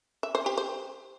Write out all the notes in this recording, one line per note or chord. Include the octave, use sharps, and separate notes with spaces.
E5
C5
G4
C5